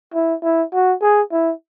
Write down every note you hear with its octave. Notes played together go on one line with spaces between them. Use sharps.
E4
E4
F#4
G#4
E4